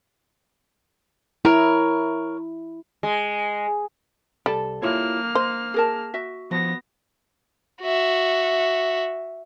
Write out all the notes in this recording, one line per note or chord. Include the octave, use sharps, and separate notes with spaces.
E4 A#4 C#5
G#3
C2 G3 A4 A5
A#3 E4 F4 C#5 F6
C5 D#5
G#4 A#4 A5
F#4 E5
F3 B3 A#6
F#4 E5